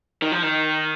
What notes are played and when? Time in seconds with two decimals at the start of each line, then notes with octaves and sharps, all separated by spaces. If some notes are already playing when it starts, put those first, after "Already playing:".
0.22 D#3
0.32 F3
0.43 D#3